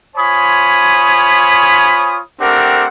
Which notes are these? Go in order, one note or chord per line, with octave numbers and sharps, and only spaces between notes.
F4 C5 C#5 G#5 B5 D#6
A3 C4 D4 G4 A#4 F#5